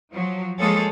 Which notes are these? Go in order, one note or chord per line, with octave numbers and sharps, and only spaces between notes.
F3 F#3
F3 G#3 A#3 G#4 A4 C#5